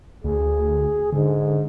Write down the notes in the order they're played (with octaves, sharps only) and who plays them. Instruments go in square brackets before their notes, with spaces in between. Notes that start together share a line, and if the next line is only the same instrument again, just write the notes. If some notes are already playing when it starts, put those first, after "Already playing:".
[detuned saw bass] D2 [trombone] G#4
[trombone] G#2 [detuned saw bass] D3